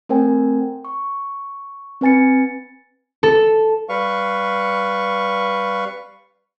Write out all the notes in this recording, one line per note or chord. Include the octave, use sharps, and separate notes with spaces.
A3 C4 A#4 C5 G5 G#5
C#6
C4 B4 G#5 A6 C#7
A4
G3 B4 F5 C#6